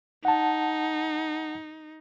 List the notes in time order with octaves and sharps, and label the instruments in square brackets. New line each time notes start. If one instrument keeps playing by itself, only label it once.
[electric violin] D#4 [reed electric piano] F#5 A5